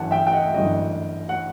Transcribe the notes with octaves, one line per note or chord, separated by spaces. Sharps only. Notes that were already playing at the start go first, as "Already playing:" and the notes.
Already playing: G1 F#2 E3 F#5 A5
E5 G5
G5
D#5 F#5
E5
G1 F#2 E3 D#5
F#5